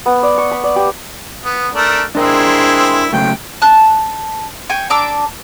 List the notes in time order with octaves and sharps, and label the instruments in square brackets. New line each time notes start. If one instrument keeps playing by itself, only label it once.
[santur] B3
D5
C#6
B5
D5
G4
[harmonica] B3
A3 D4 A#4
[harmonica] G#3 C4 E4 [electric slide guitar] D4 A#4
[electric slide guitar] C#3 F#3 A3 [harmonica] G5
[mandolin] A5 F#6
G5 G#5 C#6
D4 A#5 D6 E6